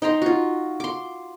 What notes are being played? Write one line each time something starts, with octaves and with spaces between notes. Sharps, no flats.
D#4 G5 A#5 C6
F4 F#4
C6 D6